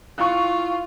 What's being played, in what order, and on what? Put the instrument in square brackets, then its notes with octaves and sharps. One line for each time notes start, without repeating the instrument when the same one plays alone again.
[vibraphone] E4 [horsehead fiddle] F4 [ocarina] F5 [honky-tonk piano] C#6 F#6